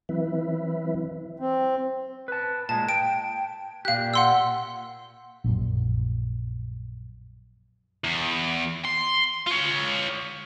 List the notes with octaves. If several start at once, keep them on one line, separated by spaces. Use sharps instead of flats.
E3 F#3 C4 E4 B4 E5
C4
B4 A5
A#2 G#3 A5
G5 D7
A#2 G4 F5 F#6
F#5 C6 E6
A#1 F#2
E2
C6
F4 C#5